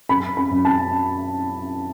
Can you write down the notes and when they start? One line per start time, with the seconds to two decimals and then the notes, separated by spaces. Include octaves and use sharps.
0.09 F#2 B5
0.37 B5
0.51 F#2
0.65 A5